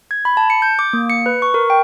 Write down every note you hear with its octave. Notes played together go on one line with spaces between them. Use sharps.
G#6
B5
A5
C#7
G6
D6
A#3
C#7
B4
C#6
A#4
G5